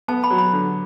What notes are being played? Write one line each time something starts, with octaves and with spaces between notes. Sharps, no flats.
B3 A5
B5
F#3
B5
D3